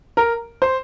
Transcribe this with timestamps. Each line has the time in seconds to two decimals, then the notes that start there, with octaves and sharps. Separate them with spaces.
0.17 A#4
0.62 C5